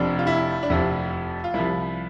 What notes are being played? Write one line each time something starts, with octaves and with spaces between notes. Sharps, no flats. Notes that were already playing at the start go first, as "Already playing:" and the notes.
Already playing: F1 F2 C3 F3 D4
F4
E4
D4
F1 F2 C3 F3 E4
F4
C2 C3 F3 E4